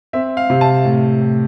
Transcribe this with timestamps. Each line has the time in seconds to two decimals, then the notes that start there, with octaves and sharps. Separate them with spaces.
0.13 C4 E5
0.37 F5
0.50 C3
0.61 A5
0.85 A2
1.20 A2